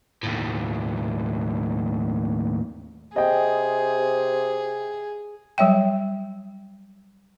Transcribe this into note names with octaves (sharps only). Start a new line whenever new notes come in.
D#2 A2
C3 G#4 D#5 G5
F#3 G3 C#5 E5 G5